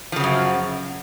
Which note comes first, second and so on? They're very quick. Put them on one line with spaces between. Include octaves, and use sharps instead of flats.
F3 C#3 F#3 F#2